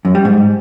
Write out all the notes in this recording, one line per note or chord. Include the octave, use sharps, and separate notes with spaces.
F#2
G3
G#2